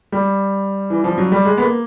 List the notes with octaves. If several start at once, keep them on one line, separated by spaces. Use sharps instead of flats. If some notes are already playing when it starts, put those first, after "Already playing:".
G3
E3
F3
F#3
G3
G#3
B3
A#3